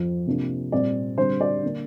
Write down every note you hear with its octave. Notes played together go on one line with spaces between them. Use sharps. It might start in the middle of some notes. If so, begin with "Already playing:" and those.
Already playing: F2 F3 C4
C3 F3 A#3 D4
A#2 G3 C4 D5
D3 G3 C4 C5
D5
D3 A#3 D4